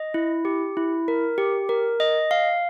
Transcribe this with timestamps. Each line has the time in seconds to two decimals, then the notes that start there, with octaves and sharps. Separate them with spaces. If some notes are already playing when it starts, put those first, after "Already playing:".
Already playing: D#5
0.14 E4
0.45 G4
0.77 E4
1.08 A#4
1.38 G4
1.69 A#4
2.00 D#5
2.31 F5